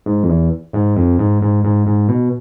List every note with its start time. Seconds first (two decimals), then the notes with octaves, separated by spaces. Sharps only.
0.06 G#2
0.23 F2
0.29 E2
0.73 G#2
0.96 F2
1.19 G#2
1.42 G#2
1.64 G#2
1.87 G#2
2.09 B2